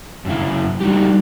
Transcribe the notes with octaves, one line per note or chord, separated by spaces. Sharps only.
F#2 C#3 E4
G3 D#4 F#4 G4